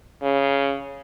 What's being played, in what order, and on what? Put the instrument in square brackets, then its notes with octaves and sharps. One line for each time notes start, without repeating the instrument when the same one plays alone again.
[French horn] C#3